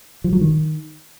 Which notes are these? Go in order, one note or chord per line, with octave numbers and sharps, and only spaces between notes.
F3
F#3
D#3